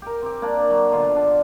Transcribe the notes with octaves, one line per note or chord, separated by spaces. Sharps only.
G4 A#4
C4 G4
A#3 D4 D5
F#3
B2 D3 F4
D4